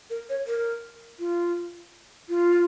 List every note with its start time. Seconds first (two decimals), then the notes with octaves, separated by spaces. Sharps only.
0.10 A#4
0.29 C#5
0.47 A#4
1.19 F4
2.29 F4